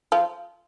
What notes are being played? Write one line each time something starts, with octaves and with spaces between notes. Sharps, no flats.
F3 F4